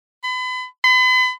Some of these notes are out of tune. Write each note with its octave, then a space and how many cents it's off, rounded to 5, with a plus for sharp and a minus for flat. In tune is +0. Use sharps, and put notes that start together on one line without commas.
B5 +35
B5 +45